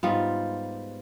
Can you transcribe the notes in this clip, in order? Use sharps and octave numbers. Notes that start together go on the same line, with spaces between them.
G#2 G3 B3 F4